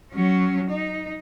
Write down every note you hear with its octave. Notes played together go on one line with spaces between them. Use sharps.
F#3 C#4
D#4